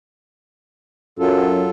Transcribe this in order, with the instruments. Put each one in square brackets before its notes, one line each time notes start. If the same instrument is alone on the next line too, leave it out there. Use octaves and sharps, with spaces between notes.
[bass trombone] F#2 [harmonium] F#3 F4 A4